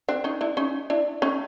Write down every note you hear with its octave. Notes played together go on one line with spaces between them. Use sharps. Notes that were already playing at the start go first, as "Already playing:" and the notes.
C4 D4
C#4 D#4
D4 E4
C#4 D#4
D4 E4
C#4 D#4